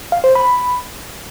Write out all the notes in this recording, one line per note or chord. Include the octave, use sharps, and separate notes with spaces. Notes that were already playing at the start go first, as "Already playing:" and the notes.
F5
C5
B5